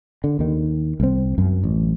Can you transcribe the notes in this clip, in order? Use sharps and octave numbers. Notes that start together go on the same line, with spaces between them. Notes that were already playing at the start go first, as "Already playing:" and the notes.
D3
D#2 D#3
C2 C4
F#2
A1